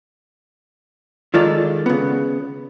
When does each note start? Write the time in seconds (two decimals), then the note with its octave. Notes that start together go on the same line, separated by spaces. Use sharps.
1.34 D#3 G#3 F4 A4 D5
1.86 C#3 B3